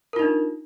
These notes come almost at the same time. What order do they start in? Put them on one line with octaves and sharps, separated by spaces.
A#4 F4 D#4 D4